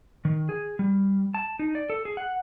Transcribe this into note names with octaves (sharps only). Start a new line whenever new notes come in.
D#3
G#4
G3
A5
D#4
D5
A4
G#4
F#5